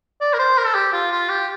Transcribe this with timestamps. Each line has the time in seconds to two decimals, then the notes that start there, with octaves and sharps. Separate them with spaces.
0.21 D5
0.34 A#4
0.39 C5
0.57 A#4
0.67 A4
0.75 G4
0.93 F4
1.11 F4
1.29 G4